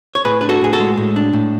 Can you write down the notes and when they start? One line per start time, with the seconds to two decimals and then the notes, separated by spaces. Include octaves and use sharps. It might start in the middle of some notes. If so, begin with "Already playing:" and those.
0.15 C#5
0.25 A2 G#4 B4
0.41 D4 B4
0.49 F#4 A4
0.61 A2 G#4
0.73 F#4 A4
0.80 G#3
0.97 A2
1.16 D4
1.33 A2